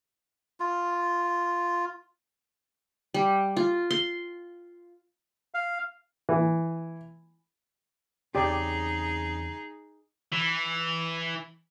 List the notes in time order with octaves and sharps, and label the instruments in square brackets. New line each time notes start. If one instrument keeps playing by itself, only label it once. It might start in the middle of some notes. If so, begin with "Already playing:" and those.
[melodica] F4
[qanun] G3
F4
C6
[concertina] F5
[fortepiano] E3
[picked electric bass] E2 C#3 C4 [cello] D#4 G#4 [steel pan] G4 D5
[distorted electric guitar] E3